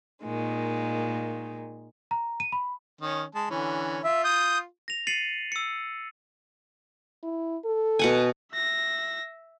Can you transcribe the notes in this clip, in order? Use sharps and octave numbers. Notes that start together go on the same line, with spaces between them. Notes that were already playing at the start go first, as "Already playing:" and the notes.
A#2 D#3 G#3
A#5
D#7
B5
D#3 C#4
G#3 A5
D3 E3 C#4
F4 E5
D#6 G6
A#6 F7
A6 C7 C#7 D#7 F#7
E6 C#7
E4
A4
B2 F#5 G#5
E5 A#6